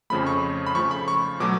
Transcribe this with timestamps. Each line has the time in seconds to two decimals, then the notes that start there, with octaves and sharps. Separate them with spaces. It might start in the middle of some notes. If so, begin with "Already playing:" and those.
0.10 F2 C#3 F3 A3 B5
0.27 C#6
0.66 B5
0.75 C#3 F3 A3 C#6
0.91 B5
1.08 C#6
1.40 B2 F#3 A3 D6